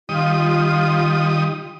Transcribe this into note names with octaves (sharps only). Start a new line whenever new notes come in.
D#3 G3 F4 D#6